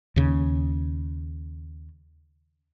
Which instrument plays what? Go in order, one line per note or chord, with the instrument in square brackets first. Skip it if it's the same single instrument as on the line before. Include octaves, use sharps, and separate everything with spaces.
[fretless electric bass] D#2 C#3